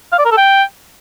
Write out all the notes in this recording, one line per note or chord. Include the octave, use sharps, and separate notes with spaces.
F5
D5
A#4
A4
G5